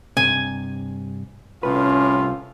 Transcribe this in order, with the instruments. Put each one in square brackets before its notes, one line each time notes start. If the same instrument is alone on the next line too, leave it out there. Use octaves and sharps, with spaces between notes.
[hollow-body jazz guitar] G2 C3 [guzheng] G#5
[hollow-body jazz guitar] C2 F2 B4 [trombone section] A2 F4 [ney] C#4